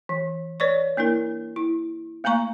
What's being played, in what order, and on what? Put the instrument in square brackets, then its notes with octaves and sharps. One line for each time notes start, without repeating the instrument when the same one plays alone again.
[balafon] E3
B4 C#5 D5 C#6
A#3 D4 E4 A#4
E4
A3 A#3 F5 A#5 C#6